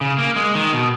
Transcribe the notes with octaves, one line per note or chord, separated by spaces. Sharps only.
C#3
A#3
G#3
D#3
B2